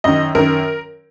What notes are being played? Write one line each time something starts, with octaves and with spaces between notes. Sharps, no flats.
F#2 D#3 D#5
F#2 D#3 A#4